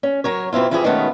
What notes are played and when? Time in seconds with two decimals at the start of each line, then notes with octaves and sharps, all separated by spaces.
0.03 C#4
0.24 F#3 A#4 C#5
0.53 B2 C4 E4 F4
0.71 E3 F3 E4 G4 G#4
0.84 B2 D#3 G#3 A3 B3 C#4